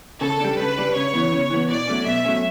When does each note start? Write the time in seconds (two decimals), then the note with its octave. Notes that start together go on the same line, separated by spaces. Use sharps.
0.21 C#3 A4
0.40 G3 D4
0.59 C#3 B4
0.78 G3 D4
0.95 C#3 C#5
1.13 E3 B3
1.32 C#3
1.50 E3 B3
1.69 B2 D5
1.87 F#3 A3 C#4
2.05 B2 E5
2.24 F#3 A3 C#4